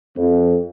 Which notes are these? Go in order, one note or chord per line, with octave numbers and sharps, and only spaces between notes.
F2